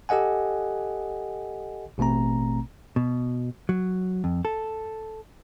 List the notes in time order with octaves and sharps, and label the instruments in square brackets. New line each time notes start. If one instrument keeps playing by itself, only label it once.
[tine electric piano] G4 A4 D#5 F#5 G#5
A1 B2 A3 C4 A#5
[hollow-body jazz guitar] B2
F#3
F2
A4